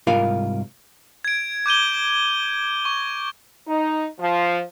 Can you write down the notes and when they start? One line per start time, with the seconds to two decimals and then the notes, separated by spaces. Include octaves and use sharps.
0.07 C2 G#2 F4 A#4 F5 B5
1.25 G#6 D7
1.66 D6 G6 D#7 G7
2.85 C#6
3.67 D#4
4.20 F3